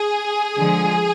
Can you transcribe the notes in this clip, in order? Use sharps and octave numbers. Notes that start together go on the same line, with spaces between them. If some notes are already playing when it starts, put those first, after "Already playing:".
Already playing: G#4
D3 F3 G#3